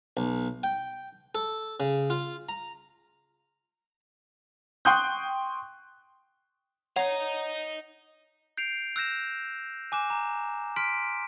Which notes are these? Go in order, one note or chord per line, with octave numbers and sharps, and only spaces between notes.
B1
G5
A4
C#3
F4
A#5
G5 C6 C#6 D#6 F#6 G6
C#5 D#5 F#5 A#5
G6 C7 D7 F7
E6 F#6 G6 A#6 E7
G#5 D6 F#6 E7
A#5
C6 F6 B6 D7